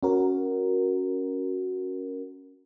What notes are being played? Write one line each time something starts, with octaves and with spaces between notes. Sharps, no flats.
C#4 F#4 A#4